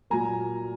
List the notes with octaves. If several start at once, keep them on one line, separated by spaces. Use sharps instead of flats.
A#2 F#3 A#3 G#5 A#5